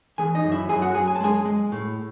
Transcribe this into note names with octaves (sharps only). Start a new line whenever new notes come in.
E3 G#4 G#5
D#4 D#5
F#2
E4 E5
F#2 G#4 G#5
F#4 F#5
F#2 G#4 G#5
G#5
A5
G#3 G#4 G#5
G#3
A2